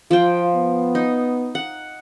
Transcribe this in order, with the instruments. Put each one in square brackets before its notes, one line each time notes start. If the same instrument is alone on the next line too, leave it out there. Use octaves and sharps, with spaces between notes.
[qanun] F3 G5 [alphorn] F4
[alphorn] B3
[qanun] D#4
F#5